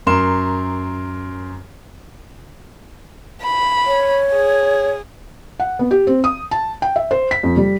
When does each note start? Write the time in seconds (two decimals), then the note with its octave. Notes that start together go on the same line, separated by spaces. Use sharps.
0.07 F#2 A#4 C6 E7
3.42 B5
3.86 C#5
4.32 G#4
5.60 F#5
5.79 B3
5.91 G4
6.07 C4
6.24 D#6
6.51 A5
6.82 G5
6.96 E5
7.11 C5
7.31 B6
7.43 F2
7.56 G3